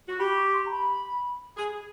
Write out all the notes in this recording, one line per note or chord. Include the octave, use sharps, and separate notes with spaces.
F#4
G4 B5
C#6
C6
A#5
B5
G#4